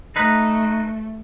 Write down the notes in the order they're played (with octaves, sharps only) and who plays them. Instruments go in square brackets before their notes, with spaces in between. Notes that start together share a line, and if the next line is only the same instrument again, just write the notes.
[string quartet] A3 [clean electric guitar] D#4 B4